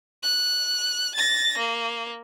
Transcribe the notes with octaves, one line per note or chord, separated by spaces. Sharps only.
F#6
A6 A#6
A#3